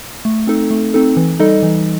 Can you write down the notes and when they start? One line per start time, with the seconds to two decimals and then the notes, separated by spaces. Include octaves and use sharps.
0.25 A3
0.47 C4 D#4 A4
0.71 A3
0.94 C4 D#4 A4
1.17 E3
1.39 G3 D#4 A4 D#5
1.63 E3